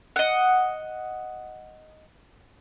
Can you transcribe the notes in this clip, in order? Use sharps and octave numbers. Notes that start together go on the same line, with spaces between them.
D#5 F#5